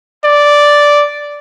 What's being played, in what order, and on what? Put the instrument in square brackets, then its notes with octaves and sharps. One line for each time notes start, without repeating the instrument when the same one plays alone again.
[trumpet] D5